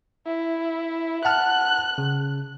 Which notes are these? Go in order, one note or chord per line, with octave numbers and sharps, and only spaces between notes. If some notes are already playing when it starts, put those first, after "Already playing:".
E4
F#5 A5 F6 F#6
C#3